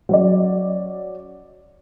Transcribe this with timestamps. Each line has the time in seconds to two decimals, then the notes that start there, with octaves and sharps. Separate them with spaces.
0.09 F#3 C#4 D5